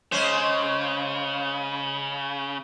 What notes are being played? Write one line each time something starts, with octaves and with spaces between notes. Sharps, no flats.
C#3 G#3 C#4 C5